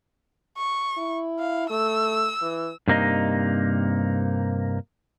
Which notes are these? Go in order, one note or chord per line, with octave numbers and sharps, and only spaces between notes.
C#6
E4
F5
A3 E6
E3
G2 C3 A#3 D#4 D#5